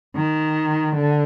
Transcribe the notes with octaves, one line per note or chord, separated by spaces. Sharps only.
D#3
D3